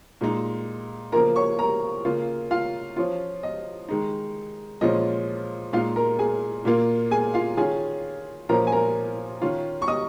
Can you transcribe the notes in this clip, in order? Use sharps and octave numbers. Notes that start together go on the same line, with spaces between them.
A#2 G#3 D#4
C#3 F3 A#3 F4 A#4 A#5
C#5 C#6
A#4 A#5
C#3 A#3 F4
F4 F5
F3 C#4 F4
D#5
D#3 G#3 D#4
A#2 F3 G#3 C#4 F4 D#5
A#2 G#3 D#4 F4 F5
A#4 A#5
G#4 G#5
A#2 A#3 F4
G#4 G#5
F4 F5
D#3 C#4 F4 G#4 G#5
A#2 F3 C#4 F4 A#4 A#5
G#5
A#4 A#5
D#3 C#4 F4
C#6
D#5 D#6